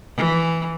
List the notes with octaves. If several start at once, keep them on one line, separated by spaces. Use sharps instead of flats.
E3